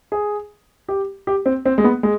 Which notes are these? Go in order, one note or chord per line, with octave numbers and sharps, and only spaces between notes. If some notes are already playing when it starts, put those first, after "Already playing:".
G#4
G4
G4
C4
C4
G#3
B3
G#3